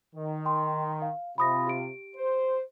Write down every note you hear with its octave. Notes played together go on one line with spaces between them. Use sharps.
D#3
G5 C6
F5
C3 F4 B5 D#6 A#6
G4 D7
C5